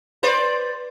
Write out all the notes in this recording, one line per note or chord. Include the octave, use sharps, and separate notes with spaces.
B4 C5 D5